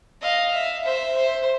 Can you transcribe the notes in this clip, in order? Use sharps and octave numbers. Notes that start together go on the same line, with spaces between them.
D#5 F5
E5
C5 E5
C5